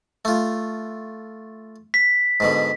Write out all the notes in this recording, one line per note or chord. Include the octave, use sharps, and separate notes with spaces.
A3 F4
B6
G#2 B2 D3